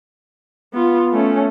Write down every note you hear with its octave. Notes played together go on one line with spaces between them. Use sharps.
B3 F4
A3 C#4